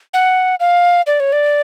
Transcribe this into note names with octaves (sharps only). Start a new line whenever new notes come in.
F#5
F5
D5
C#5
D5